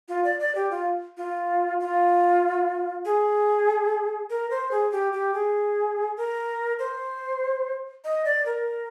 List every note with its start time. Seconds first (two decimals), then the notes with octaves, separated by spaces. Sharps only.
0.09 F4
0.24 D5
0.40 D5
0.55 G4
0.71 F4
1.17 F4
1.80 F4
3.05 G#4
4.30 A#4
4.51 C5
4.71 G#4
4.92 G4
5.13 G4
5.34 G#4
6.17 A#4
6.79 C5
8.04 D#5
8.25 D5
8.46 A#4